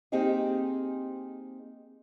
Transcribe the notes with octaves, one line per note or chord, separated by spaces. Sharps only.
A#3 C4 D#4 G4 G#4 D#5